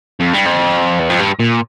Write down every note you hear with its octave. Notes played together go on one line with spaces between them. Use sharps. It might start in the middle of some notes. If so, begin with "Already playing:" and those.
F2
G2
F2
E2
F2
G2
A#2